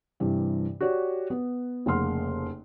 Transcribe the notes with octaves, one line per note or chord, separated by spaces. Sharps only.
G2 C3 E3
F#4 G4 C#5 D5
B3
F1 C#3 A#3 F#5 C6 F6